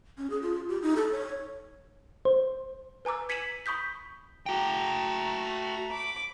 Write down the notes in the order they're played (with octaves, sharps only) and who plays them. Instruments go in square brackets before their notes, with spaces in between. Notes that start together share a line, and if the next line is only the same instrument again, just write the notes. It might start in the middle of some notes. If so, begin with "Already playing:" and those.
[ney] C#4
G#4
F4
G4
D#4
A4
C#5
[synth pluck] C5
[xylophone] B4 G#5 A#5 D6 E6
G#6 B6 C#7 D#7 E7 F#7
B5 C#6 D#6 G6 B6
[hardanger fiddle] A3 A#5 [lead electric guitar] F#4 G5
[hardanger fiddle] B5 D6